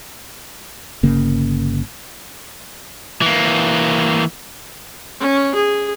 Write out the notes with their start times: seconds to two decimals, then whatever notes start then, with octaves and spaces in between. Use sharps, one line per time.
1.03 G1 C#3 A#3
3.22 E3 A#3
5.20 C#4
5.55 G#4